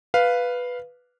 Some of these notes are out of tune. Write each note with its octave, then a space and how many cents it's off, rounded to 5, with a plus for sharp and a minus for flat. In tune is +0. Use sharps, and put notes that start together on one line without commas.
B4 +0 F5 +0